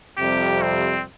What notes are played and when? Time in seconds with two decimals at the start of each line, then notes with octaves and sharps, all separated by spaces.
0.17 F2 C3 G3 G4
0.62 C4